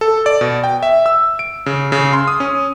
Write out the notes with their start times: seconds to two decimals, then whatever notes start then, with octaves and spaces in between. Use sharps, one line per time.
0.01 A4
0.26 D5
0.41 B2
0.64 G5
0.83 E5
1.06 E6
1.39 D7
1.66 C#3
1.92 C#3
2.13 C6
2.27 D#6
2.40 C#4